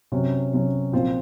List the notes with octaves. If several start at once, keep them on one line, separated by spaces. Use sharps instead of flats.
C3 F#3 C#4 F#4
C3 F#3 C#4 F#4
A#2 F3 C4 F4 C5